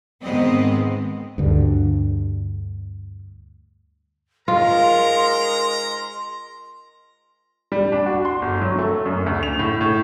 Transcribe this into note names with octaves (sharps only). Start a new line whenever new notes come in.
G#2 D#3 G#3 B3 C4 D#5
D2 G2 D3
G#2 G#3 F4 A#4 A#5 C6
G3
D4
F#4
C6
G1
F#3
A3
F#2
D2
F7
A2
A2